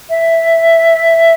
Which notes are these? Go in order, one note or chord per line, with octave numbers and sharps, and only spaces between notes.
E5